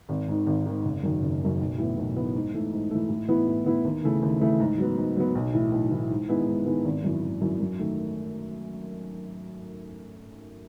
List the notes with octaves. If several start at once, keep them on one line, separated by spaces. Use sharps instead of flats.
G#1
G#2 D#3
G#1
G#2 D#3
F#1
F#2 D#3
F#1
F#2 D#3
B1
A2 E3 B3
B1
A2 E3 B3
G#2
E3 A3
G#2
E3 A3
A2
E3 B3 E4
A2
E3 B3 E4
D#2
C#3 E3 A3
D#2
C#3 E3 A3
G#2
F#3 B3
G#2
F#3 B3
B1
A2 E3
B1
A2 E3
G#2
D#3 G#3 B3 E4
G#2
D#3 G#3 B3 E4
G#1
F#2 E3
G#1
F#2 E3
F#2
D#3 A3